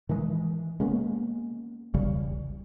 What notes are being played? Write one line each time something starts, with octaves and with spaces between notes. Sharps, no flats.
D#3 E3 G#3
G#3 A#3 B3 C#4
E1 B1 C#3 G3